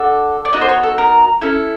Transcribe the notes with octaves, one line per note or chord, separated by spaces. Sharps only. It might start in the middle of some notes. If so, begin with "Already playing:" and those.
Already playing: D4 F#4 A4
D5
B3 D#4 F#4 D#5
C5
C#5
A4
A#4
C#4 E4 A4